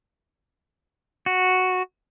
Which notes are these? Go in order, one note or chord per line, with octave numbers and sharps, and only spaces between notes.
F#4